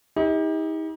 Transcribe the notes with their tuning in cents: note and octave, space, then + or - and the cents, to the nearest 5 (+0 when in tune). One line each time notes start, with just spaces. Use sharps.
D#4 +40 G4 +35